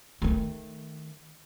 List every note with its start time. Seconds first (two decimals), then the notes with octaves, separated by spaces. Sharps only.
0.22 D#3 A3